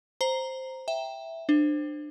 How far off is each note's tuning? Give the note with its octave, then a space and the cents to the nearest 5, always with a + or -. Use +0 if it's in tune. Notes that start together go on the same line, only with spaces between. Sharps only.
C5 +0 A#5 +0
E5 +0 G5 +0
D4 +25 C5 +0